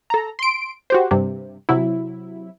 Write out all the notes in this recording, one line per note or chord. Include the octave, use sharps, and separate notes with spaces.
A4 A#5
C6 D7
F#4 G4 C5
G2 C3
C3 F#3 E4